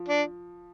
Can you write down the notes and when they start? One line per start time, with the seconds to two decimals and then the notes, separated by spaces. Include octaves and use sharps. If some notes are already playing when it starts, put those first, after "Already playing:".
Already playing: F3
0.09 D4